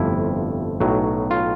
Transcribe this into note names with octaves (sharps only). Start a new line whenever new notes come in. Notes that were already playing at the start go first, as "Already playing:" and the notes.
Already playing: G1 F2 C3 F3 A3 E4
B1 A2 F#3
F4